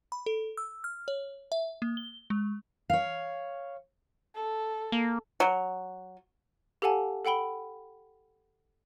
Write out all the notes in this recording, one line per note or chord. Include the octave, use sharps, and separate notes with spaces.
B5
A4
E6
F6
C#5
E5
A#3
G7
G#3
C#5 F5
A4
A#3
F#3
G4 A4 F5 F#5 G#5 A5
A4 F#5 G5 B5 G7